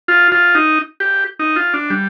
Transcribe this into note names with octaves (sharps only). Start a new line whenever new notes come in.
F4
F4
D#4
G4
D#4
F4
D4
G3